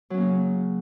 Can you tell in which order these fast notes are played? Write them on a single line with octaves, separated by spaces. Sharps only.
F#3 C#4 A#3 C#3